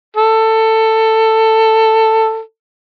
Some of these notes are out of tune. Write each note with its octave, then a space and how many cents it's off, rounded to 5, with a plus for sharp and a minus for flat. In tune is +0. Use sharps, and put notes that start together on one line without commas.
A4 +15